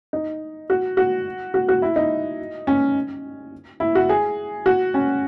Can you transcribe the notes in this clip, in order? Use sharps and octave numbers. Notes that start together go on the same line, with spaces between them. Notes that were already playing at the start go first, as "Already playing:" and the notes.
D#4
F#4
F#4
F#4
F#4
E4
D#4
C#4
E4
F#4
G#4
F#4
C#4